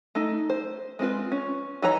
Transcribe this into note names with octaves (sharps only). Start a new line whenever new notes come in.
A3 D#4
C5
G#3 C4 F4 B4
C#4
E3 D#4 B4 C#5 A#5